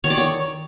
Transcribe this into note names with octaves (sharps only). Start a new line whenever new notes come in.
D#3 C#5
D5
C#5